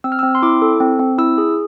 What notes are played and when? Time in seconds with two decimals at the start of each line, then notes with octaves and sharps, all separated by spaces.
0.04 C4 E6
0.12 F6
0.19 E6
0.23 C4
0.35 C6
0.42 E4 D6
0.62 A4
0.80 C4
0.99 C4
1.18 E4 E6
1.38 G#4